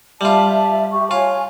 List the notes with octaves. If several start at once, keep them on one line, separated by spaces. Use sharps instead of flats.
G3 F4 E5 A5
G4 C#6
F4 C#5 G#5